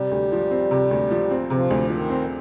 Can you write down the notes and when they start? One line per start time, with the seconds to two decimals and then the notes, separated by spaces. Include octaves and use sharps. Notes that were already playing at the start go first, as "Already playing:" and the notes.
Already playing: C3 G3
0.11 D2
0.32 F3
0.51 C4
0.71 C3
0.91 D2
1.11 F3
1.31 C4
1.50 C3 F3
1.70 D2
1.84 D3
1.90 D#3 F3
2.10 C4